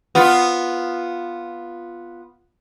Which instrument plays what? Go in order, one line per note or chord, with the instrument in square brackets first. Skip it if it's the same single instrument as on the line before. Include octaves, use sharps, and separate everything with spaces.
[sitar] B3 F4